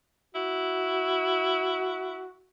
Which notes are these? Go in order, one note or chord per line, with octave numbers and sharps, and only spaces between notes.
E4 F#4